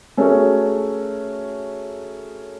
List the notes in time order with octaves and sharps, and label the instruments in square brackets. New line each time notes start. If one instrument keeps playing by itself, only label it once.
[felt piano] A3 C#4 F#4 G#4 A#4 C#5